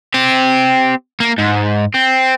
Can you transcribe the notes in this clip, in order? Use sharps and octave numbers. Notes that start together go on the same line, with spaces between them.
C4 G4
A#3
G#2
C4